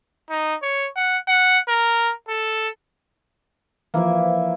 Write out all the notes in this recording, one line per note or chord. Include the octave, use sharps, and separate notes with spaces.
D#4
C#5
F#5
F#5
A#4
A4
E3 F3 A#3 E4